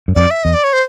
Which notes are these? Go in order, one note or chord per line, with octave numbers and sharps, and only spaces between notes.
F#2
F2 D5
E5
E2 D#5
D5
C#5
C5